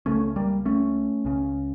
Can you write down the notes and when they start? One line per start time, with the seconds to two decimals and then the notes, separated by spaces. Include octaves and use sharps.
0.06 C#2 C#3 A3 C#4
0.36 G3 A#3
0.65 A3 C#4
1.25 C#2 C#3